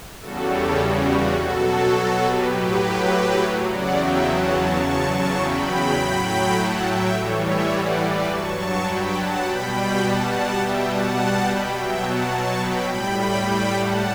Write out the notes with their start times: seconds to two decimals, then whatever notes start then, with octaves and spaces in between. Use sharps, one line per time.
0.21 E2 C#3 G3 F#4 A4
0.50 A4 C#5
0.79 F#4
1.36 B2 F#3 F#4 A4
2.22 G4 B4
2.51 A2 F#3 G4 B4
3.66 E2 C#3 F#3 D5 F#5
3.95 E5 G5
4.24 F#5 A5
4.52 A5 C#6
4.82 E2 C#3 F#3 A5 C#6
5.10 A5 C#6
5.39 G5 B5
5.97 A2 F#3
6.26 G5 B5
6.54 F#5 A5
6.83 E5 G5
7.12 A2 E3 G3 A4 C#5
7.41 C#5 E5
7.69 D5 F#5
7.98 B4 D5
8.27 G2 F#3 A5 C#6
8.56 A5 C#6
8.84 G5 B5
9.13 F#5 A5
9.42 B2 G3 G5 B5
9.71 G5 B5
10.00 F#5 A5
10.28 F#5 A5
10.57 B2 G3 E5 G5
10.86 F#5 A5
11.43 G5 B5
11.72 B2 F#3 E5 G5
12.01 F#5 A5
12.30 A5 C#6
12.59 G5 B5
12.88 A2 G3 G5 B5
13.16 G5 B5
13.45 G5 B5
13.74 F#5 A5